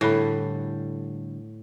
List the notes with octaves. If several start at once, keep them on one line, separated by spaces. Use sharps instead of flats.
A2 D3 G3 E4 G#4 A4 B5